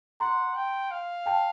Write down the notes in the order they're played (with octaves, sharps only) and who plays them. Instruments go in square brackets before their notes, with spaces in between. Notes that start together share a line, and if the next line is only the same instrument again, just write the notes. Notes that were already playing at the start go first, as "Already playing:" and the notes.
[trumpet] F#5 [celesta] A#5 C6
[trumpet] G5
F5
[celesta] G5 A5